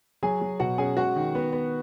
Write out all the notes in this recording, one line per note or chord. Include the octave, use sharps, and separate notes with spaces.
F#3 G#4 G#5
F#3
B2 F#4 F#5
C#4 G#4 G#5
G#3 F#4 F#5
D#3
B3
B3